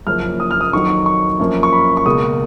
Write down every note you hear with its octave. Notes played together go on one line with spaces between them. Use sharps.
F#1 F#2 C#3 F3 A#3 F6
D#6
F6
D#6
F2 D#3 F#3 C#6
C#6
F#2 F3 A#3
C#6
B5
C#6
C#2 B2 A#3 D#6